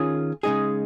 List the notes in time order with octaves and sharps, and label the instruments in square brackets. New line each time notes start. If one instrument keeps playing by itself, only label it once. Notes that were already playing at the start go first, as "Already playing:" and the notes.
Already playing: [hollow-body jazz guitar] D#3 C#4 F4 G#4
C#3 G#3 D#4 G#4